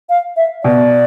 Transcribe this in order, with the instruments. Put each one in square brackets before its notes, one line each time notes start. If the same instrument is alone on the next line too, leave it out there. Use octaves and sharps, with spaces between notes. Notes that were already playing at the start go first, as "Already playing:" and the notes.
[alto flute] F5
E5
[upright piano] B2 [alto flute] D5